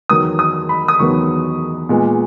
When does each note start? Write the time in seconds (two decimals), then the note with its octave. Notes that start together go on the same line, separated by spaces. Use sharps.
0.09 E2 D#3 F#3 B3 D#6
0.39 D#6
0.69 B5
0.88 D#6
0.99 E2 D#3 F#3 B3 C#6
1.89 A#2 G#3 B3